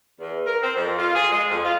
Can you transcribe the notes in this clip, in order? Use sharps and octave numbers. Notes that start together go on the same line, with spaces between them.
E2
A#4
C4
F2
F4
G#4
G#3
F2
F4